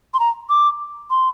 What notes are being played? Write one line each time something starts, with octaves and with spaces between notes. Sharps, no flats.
C6
A#5
D6
C6